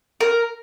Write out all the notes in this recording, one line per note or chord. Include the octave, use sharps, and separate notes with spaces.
A#4